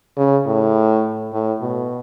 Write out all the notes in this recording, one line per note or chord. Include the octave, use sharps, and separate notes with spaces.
C#3
A2
A2
B2